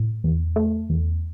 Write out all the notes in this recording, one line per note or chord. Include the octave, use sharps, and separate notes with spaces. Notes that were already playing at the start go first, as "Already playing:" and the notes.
Already playing: A2
E2
A3
E2